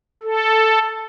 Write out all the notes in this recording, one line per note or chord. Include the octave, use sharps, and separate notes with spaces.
A4